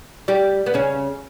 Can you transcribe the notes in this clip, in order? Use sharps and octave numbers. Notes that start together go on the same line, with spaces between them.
G3 G4
B3
C#3 C#4